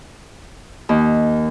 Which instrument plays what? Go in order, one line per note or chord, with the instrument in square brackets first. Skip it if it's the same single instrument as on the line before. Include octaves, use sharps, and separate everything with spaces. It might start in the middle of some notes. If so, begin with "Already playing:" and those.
[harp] D#2